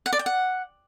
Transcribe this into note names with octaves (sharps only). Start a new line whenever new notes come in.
F#5
D5
G5
F#5